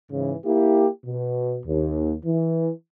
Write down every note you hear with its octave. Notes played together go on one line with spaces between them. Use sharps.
G#2 C#3 E3
A#3 E4 G4
B2
D#2
E3